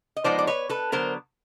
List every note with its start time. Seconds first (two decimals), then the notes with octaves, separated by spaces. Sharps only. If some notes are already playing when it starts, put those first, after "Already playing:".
0.16 D#5
0.24 F3 G#3 B3 D#4 C5 D5
0.38 D5
0.47 B4 C#5
0.69 A4 B4
0.92 D3 F#3 B3 A#4 C5